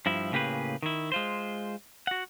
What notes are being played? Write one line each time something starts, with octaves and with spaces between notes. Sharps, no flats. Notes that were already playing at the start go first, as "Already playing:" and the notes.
G2 F3 E4
A2 C#3 A#3 G4 G#4 B4
D#3 E4
G#3 F4 C5
F#4 F#5